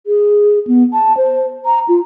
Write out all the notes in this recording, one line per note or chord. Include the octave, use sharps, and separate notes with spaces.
G#4
B3
A5
C5
A#5
F4